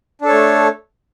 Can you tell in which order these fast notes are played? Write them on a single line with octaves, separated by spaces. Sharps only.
D4 A4 C#5 A3